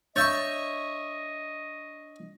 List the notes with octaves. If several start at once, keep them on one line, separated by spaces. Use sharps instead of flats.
D4 C#5 D#5 E5 C#6 E6 G6 A6